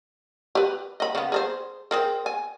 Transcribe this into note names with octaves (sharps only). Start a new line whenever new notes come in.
G4 B4
D#5 B5
C#3 B3
G#4 A4 C5
C4 G#4 A#4
G#5